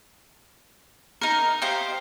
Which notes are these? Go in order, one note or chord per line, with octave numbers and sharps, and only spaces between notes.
D#4 A#4
G4 C5 D#5 F5